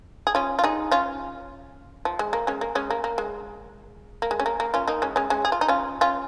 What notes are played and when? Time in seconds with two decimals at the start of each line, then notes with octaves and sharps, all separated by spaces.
0.27 G#4
0.35 C#4 F4
0.59 F4
0.64 D#4 G#4
0.91 C#4 F4
2.05 F3
2.19 G#3
2.33 A#3
2.47 G#3 C#4
2.61 A#3
2.75 G#3 C#4
2.91 A#3
3.04 A#3
3.18 G#3
4.22 A#3
4.31 G#3
4.40 C#4
4.46 A#3
4.60 A#3
4.74 C#4 F4
4.88 A#3 D#4
5.02 G#3 C#4
5.16 G#3 C#4
5.30 G#3 C#4
5.45 G#4
5.52 F4
5.61 D#4
5.68 C#4 F4
6.01 C#4 F4